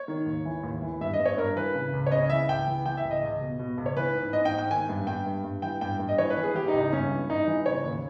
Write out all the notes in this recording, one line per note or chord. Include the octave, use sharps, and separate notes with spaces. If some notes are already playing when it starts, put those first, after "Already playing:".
Already playing: C#5
D#3
D#2
E3
D#2
E3
G2 E5
D#5
G2
C#5
G2 A#4
E3 B4
C#3
C#2
C#5
C#3 D#5
E3 E5
C#2 G5
E3
E3 G5
E5
C#2
D#5
C#2
B2
B2
C#2
C#5
E3 B4
G#2
G#2 D#5
G5
G#2
G5
D#3 G#5
G2
G2 G5
G2
G2
E3 G5
G2 G5
G2
D#5
E3 C#5
B4
E3
G#4
E3 G4
D#4
C#2
D#4
G2 C#4
E3
G2 D#4
E3
C#3 C#5
D#2